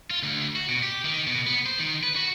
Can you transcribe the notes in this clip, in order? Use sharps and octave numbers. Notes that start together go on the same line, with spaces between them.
F4
D2
F#4
B2
G4
D#3
B2
B3
C5
D#3
B4
F#4